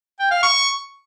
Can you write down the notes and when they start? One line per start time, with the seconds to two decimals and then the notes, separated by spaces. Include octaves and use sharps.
0.19 G5
0.31 F5
0.43 C#6